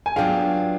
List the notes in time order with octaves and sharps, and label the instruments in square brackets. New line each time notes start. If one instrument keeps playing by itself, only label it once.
[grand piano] G#5
[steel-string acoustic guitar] F#3 B3 D4 F4 G#4 [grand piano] F5 G5